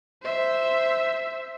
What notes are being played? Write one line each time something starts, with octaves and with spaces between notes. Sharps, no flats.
C5 E5